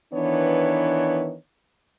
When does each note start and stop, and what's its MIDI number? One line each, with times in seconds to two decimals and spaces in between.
0.13 1.35 51
0.13 1.35 52
0.13 1.35 59
0.13 1.35 62
0.13 1.35 73